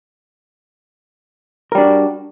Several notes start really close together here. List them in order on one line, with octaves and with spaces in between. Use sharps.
A#4 G3 D4 F#4